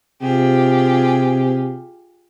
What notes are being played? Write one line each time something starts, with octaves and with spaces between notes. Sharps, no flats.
C3 F4 G4 G#4